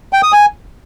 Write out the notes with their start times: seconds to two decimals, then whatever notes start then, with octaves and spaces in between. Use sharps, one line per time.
0.13 G5
0.23 D#6
0.32 G#5